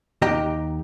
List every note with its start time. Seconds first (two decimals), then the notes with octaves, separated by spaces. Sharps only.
0.22 D#2 G4 D#5 G5 A#5